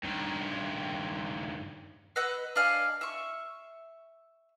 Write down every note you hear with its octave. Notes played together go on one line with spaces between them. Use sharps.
G2 D#3
B4 D#5 F#5 E6
D4 D#5 F5 G#5
E5 C#6